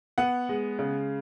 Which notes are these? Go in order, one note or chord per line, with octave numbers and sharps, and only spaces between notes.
B3 F#5
G#3
C#3